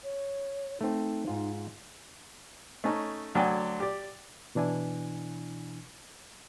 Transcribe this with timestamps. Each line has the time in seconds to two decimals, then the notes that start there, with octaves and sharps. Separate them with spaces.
0.04 C#5
0.81 A3 C4 D#4
1.27 G#2 F4
2.84 A3 C#4 D#4
3.35 D2 F#3 D5 G5 G#5
3.80 G4 D5
4.55 B2 E3 D4 E4 G#5